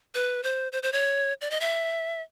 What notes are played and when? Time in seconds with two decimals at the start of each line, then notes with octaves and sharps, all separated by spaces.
0.15 B4
0.43 C5
0.72 C5
0.83 C5
0.92 C#5
1.41 D5
1.51 D#5
1.60 E5